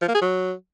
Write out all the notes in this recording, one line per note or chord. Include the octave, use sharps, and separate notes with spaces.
F3
A#3
G#4
F#3